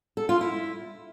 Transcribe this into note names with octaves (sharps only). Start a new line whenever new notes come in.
A4
F4
E4